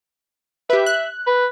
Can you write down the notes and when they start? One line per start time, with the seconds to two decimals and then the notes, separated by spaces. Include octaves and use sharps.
0.70 G4 B4 E5
0.86 F#6
1.27 B4